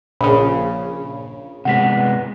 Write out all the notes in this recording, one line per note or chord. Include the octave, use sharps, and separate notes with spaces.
A#1 C#3 B5
C3 G#3 B3 F#5 B6